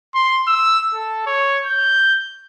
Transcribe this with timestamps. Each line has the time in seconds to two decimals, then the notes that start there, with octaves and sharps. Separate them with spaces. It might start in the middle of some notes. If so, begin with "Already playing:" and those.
0.14 C6
0.48 E6
0.94 A4
1.26 C#5
1.65 G6